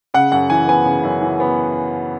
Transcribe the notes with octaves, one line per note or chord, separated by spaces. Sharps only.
C#3 F#5
F#2 F#5
E3 G#5
B3 G#5
C#3
F#2
E3
B3